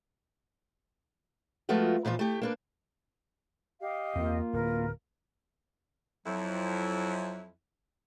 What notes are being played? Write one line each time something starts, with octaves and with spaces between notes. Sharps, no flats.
F3 G#3 A3 B3 F4 F#4
A#2 E3 F3 F4
A3 G4
A#3 D4 B4
G4 D#5 F5
E2 A#3 C4 F4
D1 A#4 B4
F2 F#3 E4